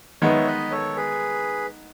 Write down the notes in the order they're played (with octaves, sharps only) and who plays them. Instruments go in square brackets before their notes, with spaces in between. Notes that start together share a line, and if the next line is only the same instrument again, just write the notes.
[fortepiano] D#3 G#3 B3 [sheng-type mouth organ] C#5 E5
[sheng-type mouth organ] B4 D#5
A4 C#5
G#4 B4